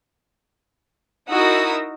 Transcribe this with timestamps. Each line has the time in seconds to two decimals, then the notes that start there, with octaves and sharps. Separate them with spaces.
1.29 D#4 E4 F#4 A#4 D#6 E6